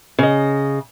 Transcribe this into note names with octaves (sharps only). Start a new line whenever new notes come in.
C#3 D#5